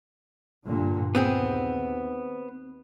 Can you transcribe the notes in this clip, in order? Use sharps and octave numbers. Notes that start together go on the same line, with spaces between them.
G2 A#2 D3
D#2 B3 C4 G#4